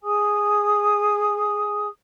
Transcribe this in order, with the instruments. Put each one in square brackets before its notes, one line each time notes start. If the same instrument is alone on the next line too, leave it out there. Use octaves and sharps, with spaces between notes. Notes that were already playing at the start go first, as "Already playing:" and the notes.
[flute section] G#4 G#5 D#6